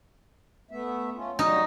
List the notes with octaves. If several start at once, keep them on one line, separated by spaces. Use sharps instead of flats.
A3 B3 E5
A3 C#4 F4
F#3 G3 D#4 F#4